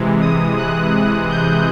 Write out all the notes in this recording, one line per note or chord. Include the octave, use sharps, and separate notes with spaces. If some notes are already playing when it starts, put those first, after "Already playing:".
Already playing: C3 E3 G#3
D#6
F#6
G6